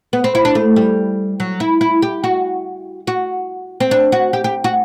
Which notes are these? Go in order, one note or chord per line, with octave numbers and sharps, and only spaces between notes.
B3
C4
E4
D4
A3
G3
F#3
E4
E4
G4
F#4
F#4
C4
D4
F#4
G4
G4
F#4